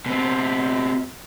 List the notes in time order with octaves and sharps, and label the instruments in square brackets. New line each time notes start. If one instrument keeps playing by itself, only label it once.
[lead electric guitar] B2 C4